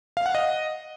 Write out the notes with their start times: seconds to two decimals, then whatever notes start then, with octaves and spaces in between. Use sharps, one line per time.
0.17 F5
0.26 F#5
0.35 D#5